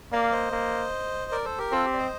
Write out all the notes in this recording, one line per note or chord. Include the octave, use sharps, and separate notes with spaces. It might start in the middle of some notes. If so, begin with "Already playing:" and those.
A#3 D5 F5
C5 D#5
A#3
A#4 D5
A4 C5
G4 A#4
C4 F4 A4
G4
D5
C5 D#5